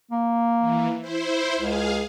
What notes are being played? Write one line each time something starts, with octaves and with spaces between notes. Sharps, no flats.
A#3
E3
E4 C5
C#2 G#4 F5